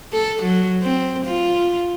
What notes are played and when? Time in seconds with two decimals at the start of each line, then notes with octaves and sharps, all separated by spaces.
0.13 A4
0.43 F#3
0.82 C4
1.26 F4